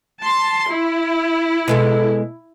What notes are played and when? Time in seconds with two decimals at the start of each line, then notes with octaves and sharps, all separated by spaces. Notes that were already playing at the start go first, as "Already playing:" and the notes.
0.22 A5 C6
0.70 E4
1.68 B2 G#3 A4